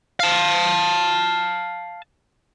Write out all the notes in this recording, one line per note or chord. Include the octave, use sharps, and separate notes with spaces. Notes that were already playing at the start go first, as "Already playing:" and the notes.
F5 A5